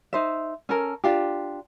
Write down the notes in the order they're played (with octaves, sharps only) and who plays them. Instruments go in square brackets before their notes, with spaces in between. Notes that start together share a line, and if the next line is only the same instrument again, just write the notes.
[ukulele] D#4 C5 E5
C#4 A4 A#4
D4 F4 G4